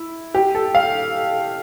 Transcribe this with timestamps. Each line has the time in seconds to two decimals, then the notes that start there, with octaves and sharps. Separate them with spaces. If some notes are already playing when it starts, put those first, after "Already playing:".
Already playing: E4
0.35 G4
0.55 A4
0.75 F5